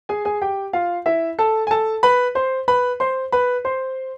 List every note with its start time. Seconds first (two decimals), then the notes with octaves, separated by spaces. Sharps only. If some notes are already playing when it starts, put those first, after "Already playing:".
0.09 G#4 G#5
0.25 G#4 G#5
0.42 G4 G5
0.73 F4 F5
1.06 E4 E5
1.39 A4 A5
1.67 G#5
1.71 A4 A5
2.03 B4 B5
2.35 C5 C6
2.68 B4 B5
3.00 C5 C6
3.32 B4 B5
3.65 C5 C6